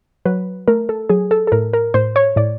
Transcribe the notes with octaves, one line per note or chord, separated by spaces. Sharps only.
F#3 B4
A3 A#4
A4
F#3 G#4
A4
A4
A2 A#4
A#4
A2 C5
C#5
A2 D5